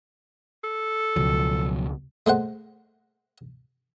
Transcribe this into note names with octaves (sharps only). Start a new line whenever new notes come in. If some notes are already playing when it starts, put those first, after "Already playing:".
A4
C#2 B2 F3 F#3
G#3 A3 C5 F#5